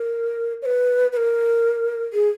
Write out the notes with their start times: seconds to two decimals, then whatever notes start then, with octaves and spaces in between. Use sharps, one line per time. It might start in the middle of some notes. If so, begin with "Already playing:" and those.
Already playing: A#4
0.62 C#5
0.66 B4
1.12 B4
1.17 A#4
2.13 G#4